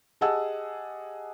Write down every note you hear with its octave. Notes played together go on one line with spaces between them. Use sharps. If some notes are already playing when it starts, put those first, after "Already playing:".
G4 G#4 D#5 F#5 A5 E6